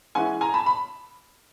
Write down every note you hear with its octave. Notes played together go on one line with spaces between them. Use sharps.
E3 G#3 C#4 E4 F#5 G#5
G#5 A#5
A5 B5
B5